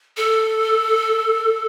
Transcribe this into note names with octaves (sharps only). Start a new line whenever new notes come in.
A4